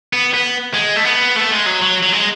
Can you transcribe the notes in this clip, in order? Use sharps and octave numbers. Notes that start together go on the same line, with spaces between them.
B3
B3
G#3
A3
B3
A3
G#3
F#3
F#3
F#3
G#3